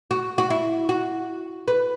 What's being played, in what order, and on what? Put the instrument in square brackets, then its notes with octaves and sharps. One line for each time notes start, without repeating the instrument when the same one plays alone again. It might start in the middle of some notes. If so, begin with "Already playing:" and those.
[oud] F#4
F#4
E4
F#4
B4